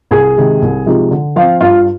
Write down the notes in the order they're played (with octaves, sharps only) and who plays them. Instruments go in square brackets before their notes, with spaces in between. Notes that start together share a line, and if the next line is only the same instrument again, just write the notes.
[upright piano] C2 G#4 G#5
C3 D#3 G#3
C2
C3 F3 G#3 D#4
D3
F3 C4 F4 F5
G2 F4 F5